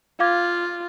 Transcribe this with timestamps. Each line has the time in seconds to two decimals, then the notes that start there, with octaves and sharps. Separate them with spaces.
0.20 F4 F5 D6 G#6